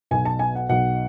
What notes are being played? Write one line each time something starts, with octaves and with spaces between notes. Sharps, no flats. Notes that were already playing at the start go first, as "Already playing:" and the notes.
B1 B2 G#5
A5
G#5
F#5
B1 B2 F#5